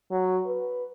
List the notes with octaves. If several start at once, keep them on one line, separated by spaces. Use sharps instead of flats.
F#3
B4